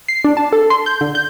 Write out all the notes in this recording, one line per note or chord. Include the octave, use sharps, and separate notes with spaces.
C7
D4
A5
A4
C6
G6
D3
G6